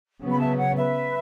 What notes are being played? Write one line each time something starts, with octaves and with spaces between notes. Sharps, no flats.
C#3 F#3 B3
B5
E5 A5
C#5 F#5
B4 E5